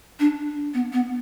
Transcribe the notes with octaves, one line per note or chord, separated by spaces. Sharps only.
D4
B3
B3